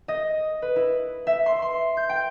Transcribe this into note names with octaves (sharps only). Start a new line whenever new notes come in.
D#5
B4
E4
E5
C6
C6
G6
G5